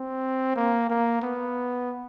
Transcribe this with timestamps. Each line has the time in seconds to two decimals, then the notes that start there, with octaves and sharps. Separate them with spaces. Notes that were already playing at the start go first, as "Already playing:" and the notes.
Already playing: C4
0.56 A#3
0.90 A#3
1.22 B3